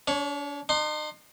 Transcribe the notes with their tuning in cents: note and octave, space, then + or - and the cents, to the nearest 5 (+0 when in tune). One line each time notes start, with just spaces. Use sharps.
D4 -40 C#5 +0
D#4 -40 C6 +15